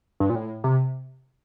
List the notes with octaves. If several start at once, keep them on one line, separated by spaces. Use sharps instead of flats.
G2
A#2
A2
C3